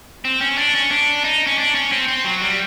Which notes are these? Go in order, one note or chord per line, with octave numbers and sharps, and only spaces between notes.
C4
C#4
D4
C#4
D4
D#4
C#4
D4
C#4
C4
C4
F#3
G3